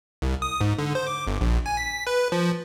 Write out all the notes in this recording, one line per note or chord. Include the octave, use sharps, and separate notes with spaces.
C2
D#6
G#2
D3
C5
D6
G1
A#1
G#5
B6
B4
F3